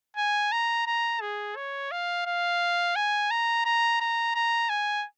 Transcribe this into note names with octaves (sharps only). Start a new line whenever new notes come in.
G#5
A#5
A#5
G#4
C#5
F5
F5
G#5
A#5
A#5
A#5
A#5
G#5